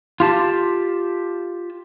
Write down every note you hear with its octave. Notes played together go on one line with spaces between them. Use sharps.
F4 G4 A5